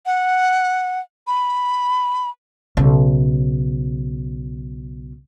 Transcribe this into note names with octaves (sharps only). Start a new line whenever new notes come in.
F#5
B5
B1 C#3